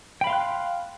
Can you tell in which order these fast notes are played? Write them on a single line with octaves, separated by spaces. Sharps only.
G5 B5 F5 C6 F#6